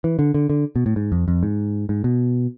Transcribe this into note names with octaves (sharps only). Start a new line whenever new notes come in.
E3
D3
D3
D3
B2
A2
G#2
F2
F2
G#2
G#2
B2